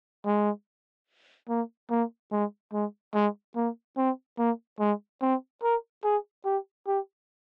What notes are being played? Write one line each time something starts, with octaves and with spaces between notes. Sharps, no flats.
G#3
A#3
A#3
G#3
G#3
G#3
A#3
C4
A#3
G#3
C4
A#4
G#4
G4
G4